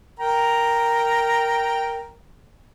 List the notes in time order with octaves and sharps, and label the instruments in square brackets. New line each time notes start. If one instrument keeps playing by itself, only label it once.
[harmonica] A#4 G5 A#5